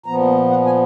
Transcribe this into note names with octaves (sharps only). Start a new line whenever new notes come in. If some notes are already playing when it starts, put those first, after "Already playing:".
A#2 F3 B3 A#5
F#5
G#5